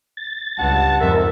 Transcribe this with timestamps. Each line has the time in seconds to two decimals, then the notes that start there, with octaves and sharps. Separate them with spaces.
0.17 A6
0.59 C#2 G2 F#5 A5
1.01 F2 G#2 A#4 E5